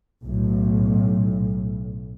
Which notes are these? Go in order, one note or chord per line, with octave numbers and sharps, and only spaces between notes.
B1 A2